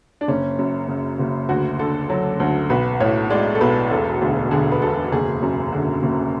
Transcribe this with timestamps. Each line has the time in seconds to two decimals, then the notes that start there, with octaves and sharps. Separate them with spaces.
0.21 D4
0.28 F#1 C#4
0.59 F#2
0.88 C#3
1.19 F#1
1.49 D2 F#4
1.79 D3 A4
2.10 F#3
2.40 D2
2.70 B1 B4
3.00 A2 C#5
3.30 G#3 D5
3.55 A4
3.61 B1 B4
3.91 E1 A4
4.21 D2 G#4
4.51 D3 G#4
4.72 B4
4.82 E1 A4
5.12 F#1 G#4
5.42 F#2
5.72 D3
6.03 F#1